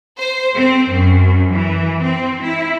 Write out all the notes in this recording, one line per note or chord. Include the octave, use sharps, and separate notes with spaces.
C5
C4
F#2
E3
C4
E4